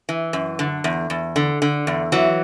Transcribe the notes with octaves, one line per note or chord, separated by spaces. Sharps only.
E3
F#2
D3
E2
E2
D3
D3
E2
E3 F#3